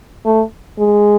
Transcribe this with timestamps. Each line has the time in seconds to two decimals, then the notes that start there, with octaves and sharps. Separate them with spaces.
0.25 A3
0.79 G#3